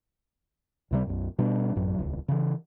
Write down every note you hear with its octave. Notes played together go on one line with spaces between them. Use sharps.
C#2 C3 G3
B1 F#2
B2 G3 D4
A1 F#2 F#3
D#1 C#2
C#3 E3